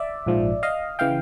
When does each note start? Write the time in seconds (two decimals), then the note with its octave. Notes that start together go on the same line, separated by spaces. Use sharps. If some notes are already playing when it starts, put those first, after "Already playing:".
Already playing: D5 E5
0.26 A#1 G#2 F3
0.63 D#5 F5
0.99 C#3 E3 F5 G5